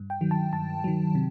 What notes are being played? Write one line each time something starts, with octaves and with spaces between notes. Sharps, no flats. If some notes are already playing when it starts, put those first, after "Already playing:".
Already playing: G2
G5
D#3 F#3
A5
G2 A5
D#3 F#3
C3